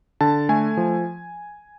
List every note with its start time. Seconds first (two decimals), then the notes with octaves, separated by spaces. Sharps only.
0.21 D3 A5
0.49 A3 G#5
0.77 F3